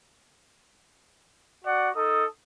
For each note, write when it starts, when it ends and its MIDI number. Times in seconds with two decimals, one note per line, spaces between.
1.65 1.90 66
1.65 1.90 74
1.65 1.90 78
1.96 2.25 63
1.96 2.25 69
1.96 2.25 87